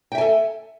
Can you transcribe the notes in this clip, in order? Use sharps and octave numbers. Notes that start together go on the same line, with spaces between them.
A4 E5 G5 G#5